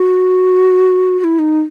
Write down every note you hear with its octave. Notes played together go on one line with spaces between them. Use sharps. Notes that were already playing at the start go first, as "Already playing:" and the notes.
Already playing: F#4
F#4
E4
D#4